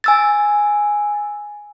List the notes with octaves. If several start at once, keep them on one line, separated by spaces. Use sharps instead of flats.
G#5 E6 A6